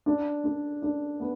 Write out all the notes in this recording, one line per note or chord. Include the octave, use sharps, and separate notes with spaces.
D4
D4
D4
B3